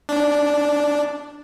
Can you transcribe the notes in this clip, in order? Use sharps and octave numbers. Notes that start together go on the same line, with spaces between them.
D4